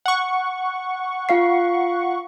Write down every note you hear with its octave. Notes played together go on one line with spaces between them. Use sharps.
F#5 C#6
F4 F5 C7